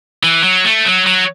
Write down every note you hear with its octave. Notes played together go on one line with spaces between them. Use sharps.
E3
F#3
A3
F#3
F#3